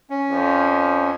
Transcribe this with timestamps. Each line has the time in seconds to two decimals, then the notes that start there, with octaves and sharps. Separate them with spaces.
0.10 C#4
0.31 F2